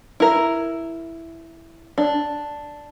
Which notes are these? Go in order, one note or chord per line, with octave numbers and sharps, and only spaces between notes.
E4 A#4
D4